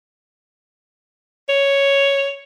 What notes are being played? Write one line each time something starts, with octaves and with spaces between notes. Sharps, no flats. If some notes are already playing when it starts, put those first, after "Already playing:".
C#5